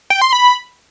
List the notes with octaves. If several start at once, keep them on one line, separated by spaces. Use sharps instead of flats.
G5
C6
B5